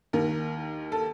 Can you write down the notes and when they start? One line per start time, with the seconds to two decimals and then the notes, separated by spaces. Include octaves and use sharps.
0.13 D#2 D#3 A#4
0.92 A4